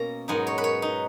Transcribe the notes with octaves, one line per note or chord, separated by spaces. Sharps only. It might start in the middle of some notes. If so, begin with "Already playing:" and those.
Already playing: B2 A#3 C#4 A#5
G#2 F#3 B3 D#4 G#5
C#5
B4
C#5
D#4